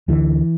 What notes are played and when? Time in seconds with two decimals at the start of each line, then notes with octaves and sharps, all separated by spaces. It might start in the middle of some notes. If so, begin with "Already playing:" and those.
0.08 D2 D3 E3